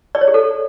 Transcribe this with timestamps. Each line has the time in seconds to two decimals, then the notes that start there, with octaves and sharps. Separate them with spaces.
0.15 D5
0.21 C#5
0.28 G#4
0.34 A4